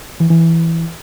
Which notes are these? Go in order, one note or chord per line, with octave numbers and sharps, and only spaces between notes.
E3
E3
E3